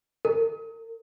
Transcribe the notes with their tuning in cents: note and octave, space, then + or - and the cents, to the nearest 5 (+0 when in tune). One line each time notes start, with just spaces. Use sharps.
A#4 -35